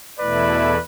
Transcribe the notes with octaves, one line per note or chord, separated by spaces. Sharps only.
E2 B2 A3 E4 B4 D5